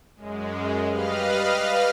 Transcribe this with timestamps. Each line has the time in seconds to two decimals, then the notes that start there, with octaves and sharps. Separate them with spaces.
0.16 F#2 G#3
0.88 G3 B4 D#5 F5 F6